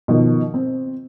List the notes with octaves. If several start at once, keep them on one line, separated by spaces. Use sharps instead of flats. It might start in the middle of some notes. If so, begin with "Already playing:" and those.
B2 D#3 F3
C4